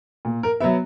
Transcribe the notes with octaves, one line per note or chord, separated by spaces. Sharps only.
A#2
A#4
F#3 B3 E5